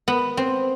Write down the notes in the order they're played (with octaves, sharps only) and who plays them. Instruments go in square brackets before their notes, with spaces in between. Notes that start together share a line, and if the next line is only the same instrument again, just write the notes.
[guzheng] B3
C4